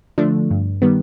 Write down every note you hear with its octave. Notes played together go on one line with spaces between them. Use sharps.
D3 F3 A3 D4
G2
D#3 G3 B3